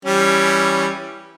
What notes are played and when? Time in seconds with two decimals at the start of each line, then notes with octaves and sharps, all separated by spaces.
0.05 E3 G3 C#4